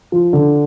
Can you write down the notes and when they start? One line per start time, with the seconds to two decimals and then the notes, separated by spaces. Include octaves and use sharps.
0.12 F3
0.33 D3